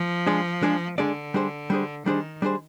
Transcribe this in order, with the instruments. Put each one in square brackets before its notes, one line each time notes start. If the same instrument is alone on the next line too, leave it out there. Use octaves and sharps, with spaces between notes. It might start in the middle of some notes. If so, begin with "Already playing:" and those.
Already playing: [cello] F3
[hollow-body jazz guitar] G#3 D4 G#4 D5
G#3 D4 G#4 D5
[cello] D3 [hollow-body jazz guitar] G#3 D4 G#4 D5
[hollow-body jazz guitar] G3 D4 G#4 C5
G3 D4 G#4 C5
[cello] D#3 [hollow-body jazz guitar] G3 D4 G#4 C5
[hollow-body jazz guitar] G3 D4 G#4 C5